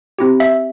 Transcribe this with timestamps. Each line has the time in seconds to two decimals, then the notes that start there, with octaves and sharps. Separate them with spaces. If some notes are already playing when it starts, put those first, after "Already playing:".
0.18 C4 E4 G4
0.40 E5